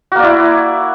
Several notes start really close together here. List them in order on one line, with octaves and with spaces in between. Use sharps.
F#4 A#3 D5 E4